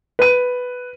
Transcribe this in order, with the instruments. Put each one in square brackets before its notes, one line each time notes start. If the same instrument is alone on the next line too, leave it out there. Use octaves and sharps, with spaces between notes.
[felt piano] B4 D#7